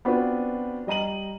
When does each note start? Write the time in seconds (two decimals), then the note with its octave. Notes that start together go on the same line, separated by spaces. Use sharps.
0.05 B3 C4 D4 F4 F#4 B4
0.87 G3 D#5 A#5 D#7 F#7